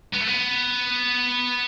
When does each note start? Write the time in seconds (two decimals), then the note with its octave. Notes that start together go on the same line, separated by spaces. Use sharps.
0.13 B3
0.20 A3
0.27 B3